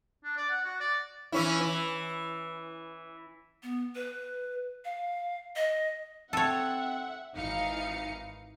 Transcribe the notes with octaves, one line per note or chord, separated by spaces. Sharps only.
D4
D5
F#5
F#4
D5
E3 C#4 E4
E3
B3
B4
F5
D#5
C4 A4 C#5 E5 F#5
G#1 E3 D#4 F5 C#7